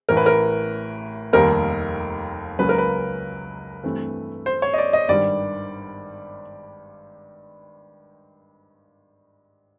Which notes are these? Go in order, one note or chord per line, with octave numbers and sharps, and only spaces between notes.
A1 A2 E3 A#4
B4
A#4
F1 D#2 D#3 G3 A#3 A#4
C#2 C#3 F#3 A#3 B4
A#4
B4
G2 E3 A3 C4
C5
C#5
D#5
D5
D#5
G#1 G2 D#3 G3 D5